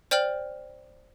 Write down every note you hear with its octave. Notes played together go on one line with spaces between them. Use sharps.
C5 D5 G5 F6 F#7